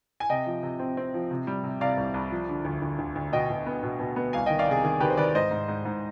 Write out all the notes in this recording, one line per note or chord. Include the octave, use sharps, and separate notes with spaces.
G#5
C3 D#5 G5
F3
C3
C4
C4
F3
C3
G3
C3
C3 D5 F5
C2
C2
F3
D3
D2
D2
D2
D2
B2 D#5 G5
B2
B3
B2
B2
B3
C2 F5 G#5
D#3 D#5 G5
D5 F5
C3 G#4
D#3 G#4
D#3 G4 B4
C5
D#3 B4 D5
G#2 C5 D#5
G#2
G#2
G#2